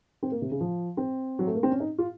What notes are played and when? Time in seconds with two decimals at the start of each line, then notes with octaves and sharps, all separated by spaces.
0.23 C4
0.32 A#3
0.42 C3
0.51 C#3
0.61 F3
0.97 C4
1.39 F#3
1.47 A3
1.55 A#3
1.63 C4
1.71 C#4
1.80 D#4
1.98 F4